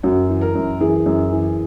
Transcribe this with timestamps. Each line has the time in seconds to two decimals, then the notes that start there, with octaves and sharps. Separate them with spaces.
0.03 F#2 F#4
0.29 E3
0.41 A#4
0.55 F#2
0.80 E3 G#4
1.06 F#2
1.32 E3